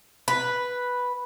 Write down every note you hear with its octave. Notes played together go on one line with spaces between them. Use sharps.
B4